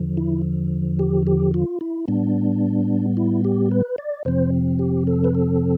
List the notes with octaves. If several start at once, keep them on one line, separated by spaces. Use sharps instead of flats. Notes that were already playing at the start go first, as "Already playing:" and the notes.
Already playing: E2 D3 F3
E4
G4
G4
F4
E4
A2 G3 B3 D4
E4
G4
B4
D5
F2 C3 F3 C4 C5
G4
A4
B4
A4